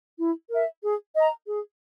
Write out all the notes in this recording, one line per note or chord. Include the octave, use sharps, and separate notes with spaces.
E4
A#4 E5
G#4
D#5 A#5
G#4